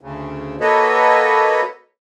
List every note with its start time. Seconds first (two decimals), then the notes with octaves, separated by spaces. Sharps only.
0.01 D2 C#3
0.60 A#3 F#4 A4 B4 C#5 D#5